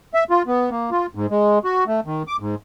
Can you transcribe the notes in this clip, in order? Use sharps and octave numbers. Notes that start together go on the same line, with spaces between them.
E5
F4
B3
A#3
F4
G#2
G#3
F#4
A3
D#3
D6
G#2